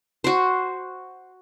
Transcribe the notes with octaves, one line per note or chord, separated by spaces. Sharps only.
F#4 C5